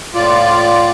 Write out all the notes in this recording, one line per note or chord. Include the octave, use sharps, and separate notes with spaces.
A2 F4 D5